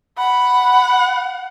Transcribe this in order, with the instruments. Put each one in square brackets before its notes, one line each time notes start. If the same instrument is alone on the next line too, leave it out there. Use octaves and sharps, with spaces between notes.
[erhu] F#5 [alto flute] B5